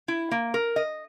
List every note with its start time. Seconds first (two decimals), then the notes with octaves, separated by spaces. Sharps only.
0.08 E4
0.31 A#3
0.54 A#4
0.76 D#5